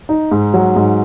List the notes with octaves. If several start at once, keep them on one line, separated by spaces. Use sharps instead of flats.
D#4
G#2
F#3
G#2